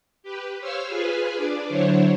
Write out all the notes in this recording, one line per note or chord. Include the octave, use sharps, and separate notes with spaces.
G4 B4
C5 C#5 F5 E6 F6
F4 G#4 B4 G#5
D4 D5
D3 F#3 D4 E4 C5 C#5